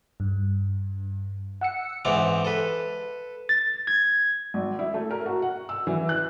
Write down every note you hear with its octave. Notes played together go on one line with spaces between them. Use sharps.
G2
F#5 E6 C#7
G#2 E3 B3 C4 D5 D6
A4 B4
A6
G#6
G#1
E4
A3
A#4
F#4
F#5
E6
E3
F#6